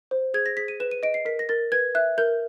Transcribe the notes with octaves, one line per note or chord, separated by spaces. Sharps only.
C5
G#4 G#6
A#6
G#4 B6
D#7
B4 E7
D#7
D#5 D7
C7
A#4 B6
A#6
A#4 A6
B4 G#6
E5 F#6
A#4 G6